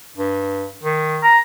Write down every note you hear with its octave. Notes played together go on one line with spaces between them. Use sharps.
G2
D#3
A#5